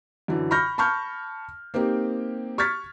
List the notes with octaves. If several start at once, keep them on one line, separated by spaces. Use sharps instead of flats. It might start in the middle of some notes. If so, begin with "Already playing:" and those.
F#2 D3 E3
B5 C#6 F6 G6 A#6
A5 B5 C#6 F6 G6
A#3 C4 D#4 G4
C#6 F6 G#6 A6 B6